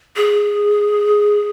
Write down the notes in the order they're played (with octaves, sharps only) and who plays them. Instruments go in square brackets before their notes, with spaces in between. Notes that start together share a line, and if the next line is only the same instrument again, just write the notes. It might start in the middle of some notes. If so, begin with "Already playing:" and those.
[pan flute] G#4